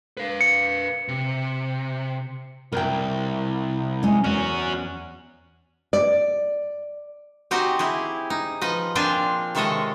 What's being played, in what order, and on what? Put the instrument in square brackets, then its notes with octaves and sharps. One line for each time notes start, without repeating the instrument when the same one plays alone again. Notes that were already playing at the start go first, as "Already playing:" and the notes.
[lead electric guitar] B4 F5
[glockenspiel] C#7
[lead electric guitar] C3
[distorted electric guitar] C2 [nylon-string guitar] A#4 G5
[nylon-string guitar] G#3 C#4
[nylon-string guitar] E2 [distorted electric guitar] C#4 F#4
[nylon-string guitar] D5
[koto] C4 D#4 F#4 G4 F#5 G#5
E4 G4 G#4
D#4
F3 D#4 B4 D#5
A#2 C4 D4 F4 G5 G#5
C3 D#3 G#3 A4 C#5 D#5